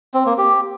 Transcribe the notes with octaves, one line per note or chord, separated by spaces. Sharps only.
C4
A#3
G4